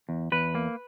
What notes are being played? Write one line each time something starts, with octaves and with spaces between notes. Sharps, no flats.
E2
E2 B4
A#3